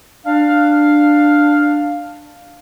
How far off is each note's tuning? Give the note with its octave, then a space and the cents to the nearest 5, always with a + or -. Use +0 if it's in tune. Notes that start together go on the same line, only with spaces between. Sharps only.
D4 +10 F5 +0